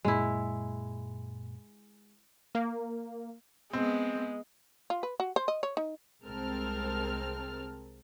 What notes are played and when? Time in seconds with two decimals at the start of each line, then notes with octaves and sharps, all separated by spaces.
0.05 F#2 A#2 G#3 E4
2.55 A#3
3.73 G#3 B3 C4
4.90 F4
5.03 B4
5.20 F#4
5.36 C5
5.48 D#5
5.63 C#5
5.77 D#4
6.25 C2 G#3 C4 A#4 A5 F6